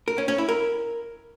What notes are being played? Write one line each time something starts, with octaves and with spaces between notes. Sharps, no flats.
A#4
C#4
C#4
E4
A#4